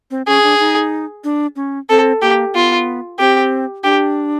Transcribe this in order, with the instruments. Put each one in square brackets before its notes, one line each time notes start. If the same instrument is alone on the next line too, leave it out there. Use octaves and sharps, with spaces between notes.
[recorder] C4
[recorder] C#4 [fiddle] G#4
[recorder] D4
D#4
D4
C#4
[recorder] C4 [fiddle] A4
[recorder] A#3 [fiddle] G4
[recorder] B3 [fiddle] F4
[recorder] C4 [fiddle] G4
[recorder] D4 [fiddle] G4